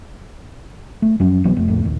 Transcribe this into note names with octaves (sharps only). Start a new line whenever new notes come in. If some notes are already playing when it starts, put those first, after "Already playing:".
A3
F#2 F3 F#3 C#4
B1 E3 F#3 B3
F1 A3
A#1 F2 A2
A#1 D#2